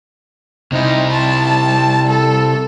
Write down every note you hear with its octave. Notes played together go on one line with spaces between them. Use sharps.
C3 D#4 E4
A5
A4